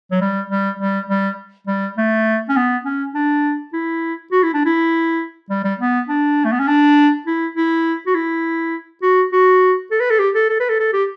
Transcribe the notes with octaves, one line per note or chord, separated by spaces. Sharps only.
F#3
G3
G3
G3
G3
G3
A3
C#4
B3
C#4
D4
E4
F#4
E4
D4
E4
G3
G3
B3
D4
A3
B3
C#4
D4
E4
E4
F#4
E4
F#4
F#4
A4
B4
A4
G4
A4
A4
B4
A4
A4
G4